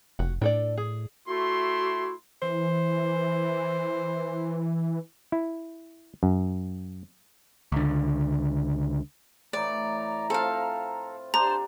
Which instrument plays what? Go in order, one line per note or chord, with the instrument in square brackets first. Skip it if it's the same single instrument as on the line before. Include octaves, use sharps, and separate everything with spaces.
[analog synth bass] F1 [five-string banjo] F#4
[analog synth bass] A2 [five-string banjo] D4 A4 D5
[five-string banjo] G#4
[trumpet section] A3 E4 C6 [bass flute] F#4
[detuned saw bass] E3 [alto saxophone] C5
[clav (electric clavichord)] E4
F#2
[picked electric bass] C#2 D3
[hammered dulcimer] A2 E3 [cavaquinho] D5 [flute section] A#5
[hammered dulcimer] C4 F4 [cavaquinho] A4 F5
[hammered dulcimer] D4 G4 [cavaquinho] C5 [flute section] A5 C6 [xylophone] A#5